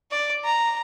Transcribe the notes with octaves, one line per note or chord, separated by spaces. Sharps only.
D5
A#5